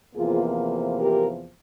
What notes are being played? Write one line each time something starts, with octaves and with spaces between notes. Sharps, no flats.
E2 C3 F3 A#3 F4 G#4
G4 A#4